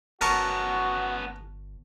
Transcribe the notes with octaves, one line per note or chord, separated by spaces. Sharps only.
G1 B3 C#4 F#4 A#4 A5 C#6